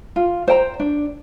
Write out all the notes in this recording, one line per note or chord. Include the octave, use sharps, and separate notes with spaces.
F4
C5 G5 A#5
D4